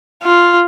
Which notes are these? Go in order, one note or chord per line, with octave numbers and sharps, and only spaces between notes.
F4